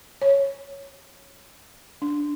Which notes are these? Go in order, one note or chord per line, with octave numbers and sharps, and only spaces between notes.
C#5
D4